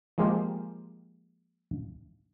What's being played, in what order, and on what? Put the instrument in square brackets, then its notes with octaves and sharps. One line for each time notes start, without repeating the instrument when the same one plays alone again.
[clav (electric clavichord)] F3 G#3 A#3 F4 G4